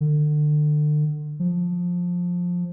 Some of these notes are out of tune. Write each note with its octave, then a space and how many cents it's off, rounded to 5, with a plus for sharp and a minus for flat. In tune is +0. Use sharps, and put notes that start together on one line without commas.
D3 +35
F3 +15